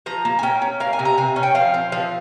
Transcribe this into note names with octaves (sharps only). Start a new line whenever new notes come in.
F3 A#5
A#3
G#5
C#4 G5
C#4
A#3 F5
G#5
C3
A#5
C3 G#5
C#4
G5
F3 F5
C4
F3 F5